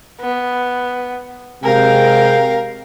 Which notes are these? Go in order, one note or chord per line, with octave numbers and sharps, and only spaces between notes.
B3
C3 G#3 A#4 F5 G5